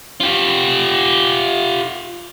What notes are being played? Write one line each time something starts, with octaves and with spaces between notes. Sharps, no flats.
F4 G4